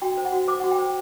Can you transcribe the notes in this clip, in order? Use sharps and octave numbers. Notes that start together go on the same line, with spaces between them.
F#4 G5
C5
F#5
F#4
C5 D6
F#4 F#5
G5
C5